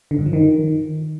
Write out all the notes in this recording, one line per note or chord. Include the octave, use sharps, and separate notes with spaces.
D3
G2
F3
D#3